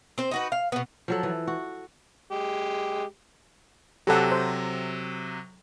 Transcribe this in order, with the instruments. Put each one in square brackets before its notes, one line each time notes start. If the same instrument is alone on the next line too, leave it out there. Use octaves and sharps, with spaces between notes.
[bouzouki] C4 C5
D#4 F#4 B4
F5
B2 B3
[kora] F3 F#3 A4
E3
F#4
[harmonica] G#3 G4
[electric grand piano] C3 F#3 [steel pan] G4 A4 F#5
[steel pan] C5